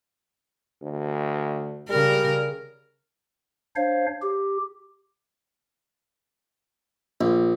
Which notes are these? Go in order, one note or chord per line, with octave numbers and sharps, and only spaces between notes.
D2
C#3 G3 A#4
D4 C5 C#5 F5
G4
A#1